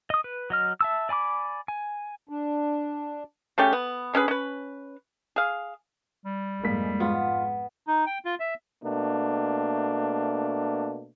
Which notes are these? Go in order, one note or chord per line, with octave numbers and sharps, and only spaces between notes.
D#5 D#6
B4
F#3 D#5 F6
E5 A5 E6
D5 G#5 B5 D6
G#5
D4
C#3 A3 C#4 G4
B3
D3 C#4 G#4 B4
C#4 B4
G#4 F5
G3
F2 G#2 G#3 A#3 B6
B3 F4
D#4
G5
F4
E5
B2 A3 A#3 D4